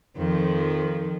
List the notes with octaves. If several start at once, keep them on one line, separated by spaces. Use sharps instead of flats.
F2 D#3 F3